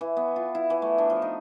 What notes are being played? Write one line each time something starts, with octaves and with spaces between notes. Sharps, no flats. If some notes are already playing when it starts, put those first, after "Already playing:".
E3
B3
F4
E4
E3
A3
D4
F3
D#4